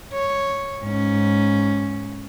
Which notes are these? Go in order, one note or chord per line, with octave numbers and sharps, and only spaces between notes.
C#5
G#2 C#4